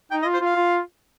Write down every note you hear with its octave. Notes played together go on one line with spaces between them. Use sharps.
D#4 G5
D#5
F4
C5
F4 F5
F4